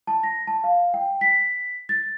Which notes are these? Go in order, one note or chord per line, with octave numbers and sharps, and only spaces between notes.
A5
A#6
A5
F5
G5
B6
A6